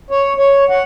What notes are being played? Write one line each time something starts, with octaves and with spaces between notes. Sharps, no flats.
C#5
C#5
F#5